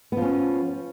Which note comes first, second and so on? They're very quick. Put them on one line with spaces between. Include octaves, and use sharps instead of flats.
B3 F3 C#4